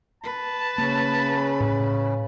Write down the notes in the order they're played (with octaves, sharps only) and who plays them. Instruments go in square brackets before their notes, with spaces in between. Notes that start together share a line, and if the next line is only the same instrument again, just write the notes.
[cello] B4 [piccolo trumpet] A5
[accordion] C#3 [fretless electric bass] A#3
[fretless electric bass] A2